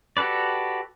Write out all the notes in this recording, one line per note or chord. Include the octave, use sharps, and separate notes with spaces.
F#4 G4 A4 B4 D5